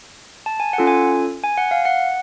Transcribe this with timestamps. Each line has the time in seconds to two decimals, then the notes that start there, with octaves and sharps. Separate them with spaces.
0.46 A5
0.60 G#5
0.73 F#5
0.78 C#4 F4 A4
0.87 G#5
1.44 G#5
1.58 F#5
1.71 F5
1.85 F#5